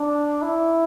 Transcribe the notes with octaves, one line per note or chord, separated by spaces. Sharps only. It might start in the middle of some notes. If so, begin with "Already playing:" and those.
Already playing: D4
E4